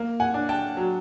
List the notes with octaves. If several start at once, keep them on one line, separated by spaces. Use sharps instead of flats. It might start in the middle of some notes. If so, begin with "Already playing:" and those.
Already playing: A#3
F#5 G#5
D4
G5 A5
F#3